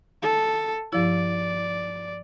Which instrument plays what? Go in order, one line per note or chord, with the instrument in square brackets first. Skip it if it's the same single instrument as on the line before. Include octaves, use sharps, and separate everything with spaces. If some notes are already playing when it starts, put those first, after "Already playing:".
[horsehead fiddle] A4
[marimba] G2 F3 E4 [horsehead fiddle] D5